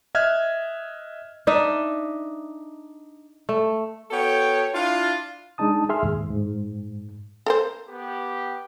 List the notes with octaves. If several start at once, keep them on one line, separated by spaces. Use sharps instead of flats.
D#5 E5 F6 F#6 G#6
D4 D#4 D#5 E5
A3
B3 F#4 A4 C#5 G5
D4 E4 F4
G#3 D4 D#4 A5 D#6
G#4 E5 C6 F6
D#2 G#2
G#2
A4 A#4 C5
B3 G4